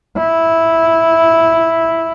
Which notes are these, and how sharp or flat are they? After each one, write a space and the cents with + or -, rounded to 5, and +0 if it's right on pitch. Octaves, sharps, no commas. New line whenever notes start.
E4 -5